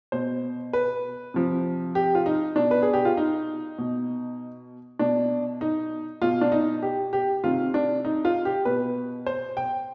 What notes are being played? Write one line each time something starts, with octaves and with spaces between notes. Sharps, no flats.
B2 C5
B4
C3 F3
G4
F4
D#4
B2 D4
B4
G#4
G4
F4
D#4
B2
B2 D4
D#4
B2 F4
D4
D#4
G4
G4
C3 D#3 F4
D4
D#4
F4
G4
B2 B4
C5
G5